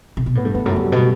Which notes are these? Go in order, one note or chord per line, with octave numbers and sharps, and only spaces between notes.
C3
B2
A2 B3
G2 A3
E2 B3
F#2 A3
F#3
G2 G3
B2